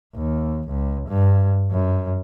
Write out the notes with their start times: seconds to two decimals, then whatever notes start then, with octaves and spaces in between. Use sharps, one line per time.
0.15 D#2
0.68 C#2
1.09 G2
1.71 F#2